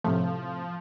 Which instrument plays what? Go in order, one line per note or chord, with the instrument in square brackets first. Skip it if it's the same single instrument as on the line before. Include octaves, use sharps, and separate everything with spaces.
[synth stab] A2 C3 A3 [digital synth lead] F3